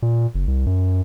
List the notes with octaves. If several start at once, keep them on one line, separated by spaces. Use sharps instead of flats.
A#2
F#1
C2
F#2